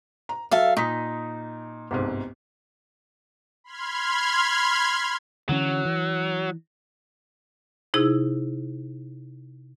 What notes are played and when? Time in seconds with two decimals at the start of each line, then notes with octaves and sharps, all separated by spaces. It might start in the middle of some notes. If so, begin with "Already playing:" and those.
0.29 A#5
0.51 F#3 A4 E5 F5
0.77 A#2 D#4 D#6 B6
1.91 G1 C2 G#2
3.64 B5 C6 F6 G#6
5.49 D3 E3 F#3 C#4
5.85 E3
7.94 C3 D#4 E4 G#4 E6